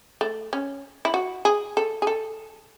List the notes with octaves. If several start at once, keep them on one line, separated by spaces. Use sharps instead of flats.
A3
C#4
E4
F#4
G#4
A4
G#4
A4